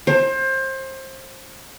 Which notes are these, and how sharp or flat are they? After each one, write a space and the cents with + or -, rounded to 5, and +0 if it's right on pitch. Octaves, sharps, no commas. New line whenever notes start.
C5 +25